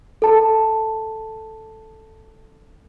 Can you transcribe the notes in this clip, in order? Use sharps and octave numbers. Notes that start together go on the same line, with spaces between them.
A4 A5